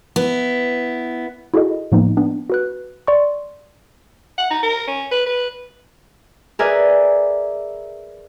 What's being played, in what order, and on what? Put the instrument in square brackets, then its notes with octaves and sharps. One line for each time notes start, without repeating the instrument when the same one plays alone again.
[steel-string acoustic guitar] B3 E4
[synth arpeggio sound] E4 F#4 G#4 A4 D#5
A2 F3 A#3 B3 D#4
B3 D4
F#4 B4 F#6
D5 C6 C#6
[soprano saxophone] F#5
D#4
A#4
C#4
B4
B4
[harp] G#4 A#4 B4 D5 E5 G#5